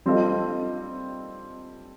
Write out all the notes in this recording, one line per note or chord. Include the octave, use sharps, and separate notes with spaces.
G3 C4 F4 A4 D#5